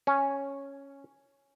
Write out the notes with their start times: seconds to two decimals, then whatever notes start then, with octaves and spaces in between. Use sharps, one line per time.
0.07 C#4